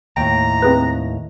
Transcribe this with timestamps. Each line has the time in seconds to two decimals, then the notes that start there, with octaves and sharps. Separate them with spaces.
0.17 D#2 A2 G5 A#5
0.62 C4 G#4 B4